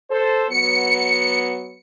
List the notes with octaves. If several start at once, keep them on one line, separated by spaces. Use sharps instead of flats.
A4 C5
F#3 B3 C#7